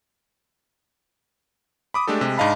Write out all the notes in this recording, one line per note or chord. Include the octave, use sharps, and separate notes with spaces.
B5 D6 D#6
G#3 A3 D4 G4 A4
C3 G#3
G#2 D4 D#5 F5 A5 B5